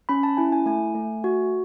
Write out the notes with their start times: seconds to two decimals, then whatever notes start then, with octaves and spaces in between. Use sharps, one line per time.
0.09 C#4 B5
0.23 A5
0.37 E4 G#5
0.52 G#5
0.66 A3 G#5
0.95 A3
1.24 F#4